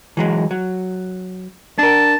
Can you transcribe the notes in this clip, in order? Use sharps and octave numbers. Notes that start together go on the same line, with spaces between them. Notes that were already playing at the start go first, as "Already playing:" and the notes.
E3 F#3 G#3
F#3
D4 A#4 A5